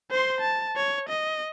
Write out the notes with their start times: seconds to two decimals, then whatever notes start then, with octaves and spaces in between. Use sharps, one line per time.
0.11 C5 C6
0.40 A5
0.76 C#5
1.09 D#5